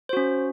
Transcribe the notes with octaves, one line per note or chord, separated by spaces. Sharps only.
C#4 F#4 C5